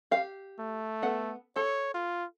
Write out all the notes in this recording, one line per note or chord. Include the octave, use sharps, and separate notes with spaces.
G4 F5
A3
B3 A4 F#5
A4 C#5
F4